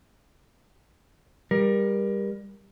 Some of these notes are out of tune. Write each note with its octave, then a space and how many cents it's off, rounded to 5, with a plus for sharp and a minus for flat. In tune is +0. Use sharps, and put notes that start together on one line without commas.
G3 +25 A#4 +25